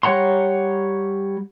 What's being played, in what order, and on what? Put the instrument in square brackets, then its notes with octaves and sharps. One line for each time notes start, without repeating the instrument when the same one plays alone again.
[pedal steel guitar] G3 C#5 F#5 A#5 C6